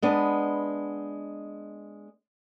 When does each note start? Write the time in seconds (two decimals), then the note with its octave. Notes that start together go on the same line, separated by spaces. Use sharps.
0.02 G#3 B3 D4